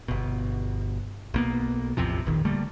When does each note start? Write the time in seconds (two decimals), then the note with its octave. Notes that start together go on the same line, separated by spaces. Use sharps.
0.08 G1 B2
1.34 B1 A#3 B3
1.97 A1 E2 C3 F3
2.25 E1 A#1 D#3
2.45 D3 G3 A3 A#3